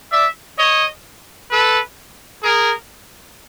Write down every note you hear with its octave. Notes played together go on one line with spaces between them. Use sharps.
D5 E5
C#5 D#5
A4 B4
G#4 A#4